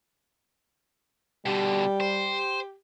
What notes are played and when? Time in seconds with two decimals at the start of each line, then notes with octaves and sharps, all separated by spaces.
1.46 B2 D3 G3 G4
2.00 C5